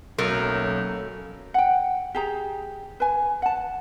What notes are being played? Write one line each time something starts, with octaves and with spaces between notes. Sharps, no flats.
B1 F#3 A3 A#3 C#4 A#4
F#5 G5
G4 G#4 A#5
B4 G#5
F#5 A5